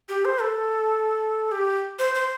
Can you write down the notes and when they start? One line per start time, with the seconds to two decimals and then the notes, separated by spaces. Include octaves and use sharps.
0.09 G4
0.25 C5
0.41 A4
1.51 G4
1.99 C5
2.15 C5